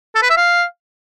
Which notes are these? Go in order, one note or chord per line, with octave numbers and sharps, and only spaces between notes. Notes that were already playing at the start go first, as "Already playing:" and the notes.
A4
B4
E5
F5